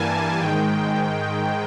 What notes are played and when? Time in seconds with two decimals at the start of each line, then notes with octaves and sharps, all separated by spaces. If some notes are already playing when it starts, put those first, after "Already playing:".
Already playing: G2 E3 G3 A#3 G#5 A5
0.39 G#2 D#3 G#3 G5